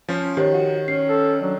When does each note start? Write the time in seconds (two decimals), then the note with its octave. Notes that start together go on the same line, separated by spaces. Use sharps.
0.08 F3 C#4 C5
0.37 D#3 G4 C5 C#5
0.53 F#4
0.88 C#4 C7
1.08 A4
1.42 F#3 D4